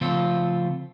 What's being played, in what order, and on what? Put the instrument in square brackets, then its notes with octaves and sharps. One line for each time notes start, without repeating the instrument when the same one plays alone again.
[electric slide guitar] C#3 F3 A3 C4 F4 A4